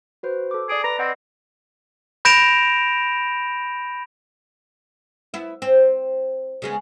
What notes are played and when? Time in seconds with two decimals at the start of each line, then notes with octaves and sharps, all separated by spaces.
0.23 F#4 B4 C5
0.51 A4 D6
0.69 G#4 D5 D7
0.84 B4 A#5 B5 A#6
0.99 C4 D5 D#5 F#5
2.25 B5 G6 A#6 D7 E7 F7
5.34 B3 E4
5.62 C4
6.62 C#3 G#3 B3